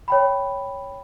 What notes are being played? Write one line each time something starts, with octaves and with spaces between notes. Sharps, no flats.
C#5 G5 B5